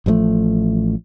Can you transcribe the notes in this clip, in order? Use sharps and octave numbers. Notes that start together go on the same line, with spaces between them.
A1 F3 F#3 A3